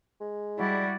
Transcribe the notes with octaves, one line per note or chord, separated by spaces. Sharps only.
G#3
G3 E4 F#4 D5